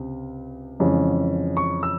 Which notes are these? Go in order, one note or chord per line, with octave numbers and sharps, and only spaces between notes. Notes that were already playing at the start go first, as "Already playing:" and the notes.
Already playing: C#2 C3
F2 C#3 E3 G#3 C#4
C#6
E6